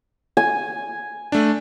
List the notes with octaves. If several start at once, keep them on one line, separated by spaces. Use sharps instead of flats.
G#5
A3 D4